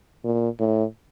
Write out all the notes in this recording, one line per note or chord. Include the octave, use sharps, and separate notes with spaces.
A#2
A2